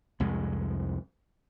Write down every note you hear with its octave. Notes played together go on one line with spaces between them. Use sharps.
C2 F2 G#3